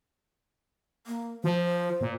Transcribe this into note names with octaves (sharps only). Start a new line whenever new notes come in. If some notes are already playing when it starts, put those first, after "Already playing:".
A#3
F3 C5
A#2